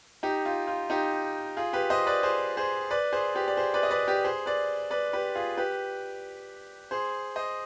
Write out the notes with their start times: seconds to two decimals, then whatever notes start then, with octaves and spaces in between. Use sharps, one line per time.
0.23 D#4 G4
0.46 F4
0.67 F4
0.90 D#4 G4
1.57 F4 G#4
1.73 G4 B4
1.90 C5 D#5
2.07 B4 D5
2.23 G#4 C5
2.57 G#4 C5
2.91 B4 D5
3.12 G#4 C5
3.35 G4 B4
3.48 D5
3.57 G#4 C5
3.74 B4 D5
3.83 D#5
3.91 B4 D5
4.07 G4 B4
4.24 G#4 C5
4.46 B4 D5
4.91 B4 D5
5.13 G4 B4
5.35 F4 G#4
5.57 G4 B4
6.91 G#4 C5
7.36 C5 D#5